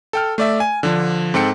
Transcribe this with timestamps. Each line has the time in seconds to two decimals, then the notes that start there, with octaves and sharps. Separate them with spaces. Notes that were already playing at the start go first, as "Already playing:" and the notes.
0.13 A4 G5 F6
0.38 A3 D5 E5
0.60 G#5
0.83 D3 F3 D4
1.34 G#2 C4 A4 G5 C#7